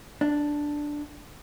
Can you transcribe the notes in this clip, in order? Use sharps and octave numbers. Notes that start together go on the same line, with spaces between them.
D4